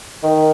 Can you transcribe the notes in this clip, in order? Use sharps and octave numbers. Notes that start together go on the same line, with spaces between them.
D#3